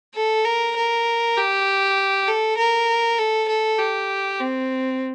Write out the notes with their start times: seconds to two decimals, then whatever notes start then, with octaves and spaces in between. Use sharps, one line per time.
0.15 A4
0.45 A#4
0.76 A#4
1.37 G4
2.28 A4
2.57 A#4
3.18 A4
3.48 A4
3.79 G4
4.40 C4